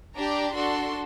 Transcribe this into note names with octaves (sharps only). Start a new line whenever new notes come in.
D4 G4 A#5
D4 F#4 A4 C6